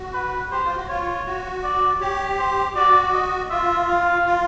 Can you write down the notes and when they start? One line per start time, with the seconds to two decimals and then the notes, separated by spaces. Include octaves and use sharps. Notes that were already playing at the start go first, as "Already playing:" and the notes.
Already playing: F#4
0.14 B4
0.51 G4 C5
0.64 F4
0.76 F#4
0.88 F4 C#5
1.26 F#4
1.63 D5
2.00 G4 C#5
2.38 C5
2.75 F#4 D5
3.13 D#5
3.50 F4 E5
3.88 F5
4.26 F4